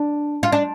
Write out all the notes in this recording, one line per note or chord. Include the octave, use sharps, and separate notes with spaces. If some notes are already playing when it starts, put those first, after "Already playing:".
Already playing: D4
F4
D4